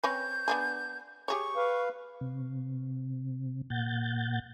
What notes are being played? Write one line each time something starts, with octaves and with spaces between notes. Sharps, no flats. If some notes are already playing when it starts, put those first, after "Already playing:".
C4 C#4 B4 G6
B3 D4 G#4
G4 G#4 C#5 C#6
B4 F5
C3
A#2 F#5 G6 A6